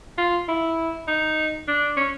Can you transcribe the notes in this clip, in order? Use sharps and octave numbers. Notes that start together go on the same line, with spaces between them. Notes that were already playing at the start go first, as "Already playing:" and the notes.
F4
E4
D#4
D4
C#4